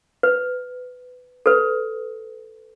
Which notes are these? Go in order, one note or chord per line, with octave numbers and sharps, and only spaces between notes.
B4
A4 B4